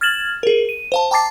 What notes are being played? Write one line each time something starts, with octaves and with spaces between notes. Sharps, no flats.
F6 G#6 A6 E7 F#7
G#4 A#4
D#7
C5 F5 A5
G5 A5 A#5 D6 A6 C7